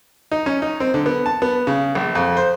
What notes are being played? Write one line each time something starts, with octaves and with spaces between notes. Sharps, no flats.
D#4
C#4
D#4
C4
D3
B3
A5
B3
C#3
A#1
F2
C5